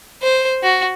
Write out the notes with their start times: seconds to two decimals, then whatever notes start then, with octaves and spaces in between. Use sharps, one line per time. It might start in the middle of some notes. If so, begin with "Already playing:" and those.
0.22 C5
0.63 F#4